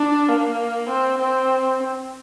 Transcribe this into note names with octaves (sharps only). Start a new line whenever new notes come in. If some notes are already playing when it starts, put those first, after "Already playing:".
Already playing: D4
A#3
C4
C4